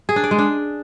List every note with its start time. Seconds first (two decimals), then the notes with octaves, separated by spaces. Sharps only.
0.09 G#4
0.16 D4
0.24 D5
0.31 G#3
0.39 D4